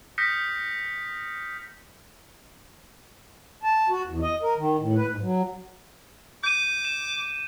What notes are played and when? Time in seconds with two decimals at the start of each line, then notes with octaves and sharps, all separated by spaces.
0.18 D#6 F6 G6 A#6 B6 C#7
3.63 A5
3.89 F#4
4.06 E2
4.22 D#5
4.42 A#4
4.57 D#3
4.79 A2
4.96 B4
5.08 G#2
5.21 F#3
6.44 D6 G6 D#7
6.85 E7